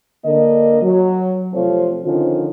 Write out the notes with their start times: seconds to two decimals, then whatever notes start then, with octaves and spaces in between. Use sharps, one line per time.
0.25 D3 A#3 D#5
0.82 F#3
1.54 C3 F3 A3 C4 F4 C#5
2.05 D3 D#3 F3 C#4 F4